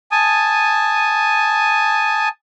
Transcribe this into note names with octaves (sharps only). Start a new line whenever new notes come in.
G#5 A5 D#6